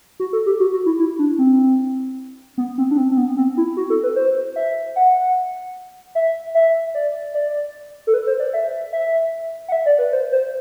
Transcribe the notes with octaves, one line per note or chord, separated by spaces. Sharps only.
F#4
A4
G4
F#4
F#4
E4
E4
D4
C4
B3
C4
D4
C4
C4
B3
C4
E4
F#4
A4
B4
C5
E5
F#5
E5
E5
D5
D5
A4
B4
C5
D5
E5
E5
F#5
E5
D5
B4
C5
C5